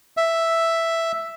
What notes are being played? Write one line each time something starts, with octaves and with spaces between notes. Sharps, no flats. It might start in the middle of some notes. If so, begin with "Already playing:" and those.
E5